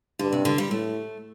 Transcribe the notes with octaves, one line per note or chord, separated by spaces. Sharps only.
G2 D3
C3
D3
G3
A2 A3